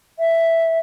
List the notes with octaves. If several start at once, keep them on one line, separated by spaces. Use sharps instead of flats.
E5